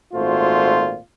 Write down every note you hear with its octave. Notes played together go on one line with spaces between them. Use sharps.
G#1 A#2 A3 F4 F#4 C5